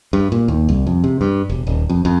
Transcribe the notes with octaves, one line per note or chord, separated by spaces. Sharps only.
G2
A#2
D#2
C2
F2
C3
G2
E1
D#1
F2
F2